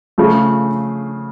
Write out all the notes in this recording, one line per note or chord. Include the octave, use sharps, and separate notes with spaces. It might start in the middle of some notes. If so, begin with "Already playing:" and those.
C#3 F3 A3